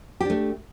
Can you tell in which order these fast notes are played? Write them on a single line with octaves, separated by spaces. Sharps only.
G4 D4 A3